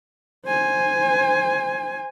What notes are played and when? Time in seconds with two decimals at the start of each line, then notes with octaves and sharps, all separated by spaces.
0.46 C5 G#5